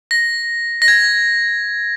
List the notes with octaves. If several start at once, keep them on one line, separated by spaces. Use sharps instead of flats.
A#6
A#6
G#6